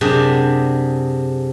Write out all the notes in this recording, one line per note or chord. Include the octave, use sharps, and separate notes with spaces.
F#2 C3 D4 G4 G#4